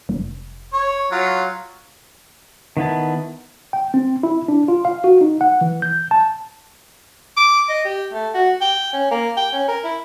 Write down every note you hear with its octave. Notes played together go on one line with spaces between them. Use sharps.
F1
C#5
F#3 F4
D#3 B3 E4 A5
G5
C4
E4
D4
F4
F5
F#4
D#4
F#5
E3
G6
A5
D6
D#5
G4
A3
F#4
G5
C#4
A#3
G5
C#4
A#4
E4